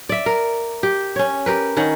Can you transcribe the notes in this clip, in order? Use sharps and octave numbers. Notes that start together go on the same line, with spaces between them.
D5 E5
A#4
G4
C#4 C#5
G4 A#4 B4
D#3 C#4 F#5